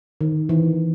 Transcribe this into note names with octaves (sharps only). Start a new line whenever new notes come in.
D#3
E3